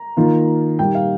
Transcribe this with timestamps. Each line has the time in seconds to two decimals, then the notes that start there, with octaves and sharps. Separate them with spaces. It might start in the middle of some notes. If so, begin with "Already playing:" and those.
Already playing: A#5
0.17 D#3 A#3 F4
0.79 A#2 G3 A#3 D#4 G5
0.95 F5